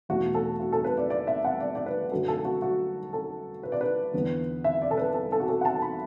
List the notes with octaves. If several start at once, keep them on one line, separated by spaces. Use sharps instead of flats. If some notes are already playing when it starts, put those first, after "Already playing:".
E2 B2 A3 F#4
A4
F#4
A4
B4
D5
D5
E5
F#5
D5
D5
B4
F#2 D3 F#3 A3 A4
A4
F#4
F#4
A4
B4
D5
B4
E2 D3 B3
E5
D5
A4
B4
A4
A4
F#4
A4
F#5
A5
B5